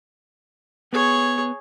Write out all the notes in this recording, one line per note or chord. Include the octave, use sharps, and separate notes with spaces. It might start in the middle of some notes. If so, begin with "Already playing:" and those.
B3 G#4 C#5